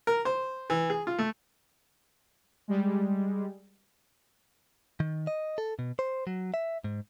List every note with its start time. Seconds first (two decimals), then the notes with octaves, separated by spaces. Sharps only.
0.07 A#4
0.25 C5
0.70 E3
0.90 G#4
1.07 F4
1.18 A3
2.68 G3 G#3
5.00 D#3
5.27 D#5
5.58 A4
5.79 B2
5.99 C5
6.27 F#3
6.54 E5
6.84 G#2